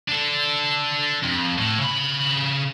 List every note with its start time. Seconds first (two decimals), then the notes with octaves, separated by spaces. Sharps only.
0.09 D4 A4
1.23 F2
1.58 A2
1.80 C#3 B5